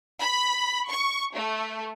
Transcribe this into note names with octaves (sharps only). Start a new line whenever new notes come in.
B5
C#6
A3